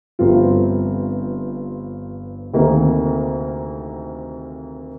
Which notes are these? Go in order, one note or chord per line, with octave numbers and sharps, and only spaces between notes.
G1 G2 F3 C4 F4
D2 C3 D#3 A#3